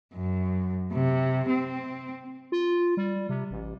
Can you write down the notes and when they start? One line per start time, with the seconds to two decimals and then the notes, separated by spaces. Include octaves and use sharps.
0.14 F#2
0.93 C3
1.50 C4
2.52 F4
2.97 G3
3.29 C3
3.51 A1